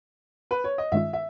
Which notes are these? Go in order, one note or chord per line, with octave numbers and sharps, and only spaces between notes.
B4
C#5
D#5
G2 D#3 G#3 C#4 F4 E5
E5